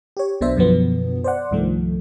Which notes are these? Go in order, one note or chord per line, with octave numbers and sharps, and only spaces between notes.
G4 C#5
B1 B2 D4 C5 E5
F#2 B2 D3 F3 B3
C5 D5 F#5
C2 G2 D#3 F3 A3